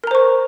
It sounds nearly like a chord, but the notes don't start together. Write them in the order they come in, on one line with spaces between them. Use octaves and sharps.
A#4 A#5 C5 C#6